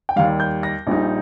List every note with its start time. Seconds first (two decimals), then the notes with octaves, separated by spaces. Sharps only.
0.09 G5
0.16 D#2 D#3 G3 F5
0.40 G6
0.63 A#6
0.87 A#1 A#2 G3 D#4